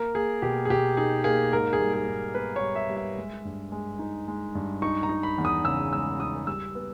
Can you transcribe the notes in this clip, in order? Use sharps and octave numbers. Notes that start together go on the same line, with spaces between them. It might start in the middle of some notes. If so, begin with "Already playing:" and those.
Already playing: A#3 A#4
A#3 G#4
B2 G4
G#4
B2 G4
D#4 G#4
A#3 G#4
G#2 A#4
G#4
G3
G#4
G#2
B3 B4
C#5
G3
E5
G3
E5
G#3
G2
G#3
D#4
G#3
G2
D#4 C#6
A#5
D#4
B5
E2
D#6
C#3 E6
G#3 E6
D#4 D#6
G3 E6
B3